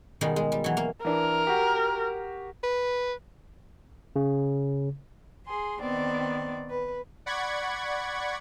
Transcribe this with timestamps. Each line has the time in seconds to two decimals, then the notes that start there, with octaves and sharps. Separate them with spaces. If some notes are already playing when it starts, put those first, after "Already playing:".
0.21 B2 D#3 G3 G#3
0.36 G#3
0.52 G3
0.64 E3 F#3
0.77 A#3
1.05 E3 D4 A#4
1.47 F#4 G4
2.64 B4
4.16 C#3
5.47 G#4 C6
5.81 D#3 B3 C4 D5
6.70 B4
7.26 D5 F#5 B5 C#6 G#6